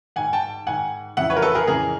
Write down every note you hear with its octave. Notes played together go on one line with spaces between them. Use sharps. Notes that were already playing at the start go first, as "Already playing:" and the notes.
G#2 D#3 F#5 G#5
G5 A5
G#2 D#3 F#5 G#5
F2 C#3 E3 E5 F#5
B4 C#5
A#4
A4 B4
G#4 A#4
F2 C#3 E3 G#4 A#4